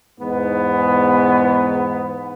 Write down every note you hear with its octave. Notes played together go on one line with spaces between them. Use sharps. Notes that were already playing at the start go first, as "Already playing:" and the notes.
E2 G#2 B3